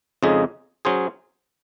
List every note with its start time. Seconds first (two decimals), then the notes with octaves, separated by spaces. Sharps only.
0.23 F2 C#3 G#3 D#4 G#4
0.85 F#3 C#4 G#4 C5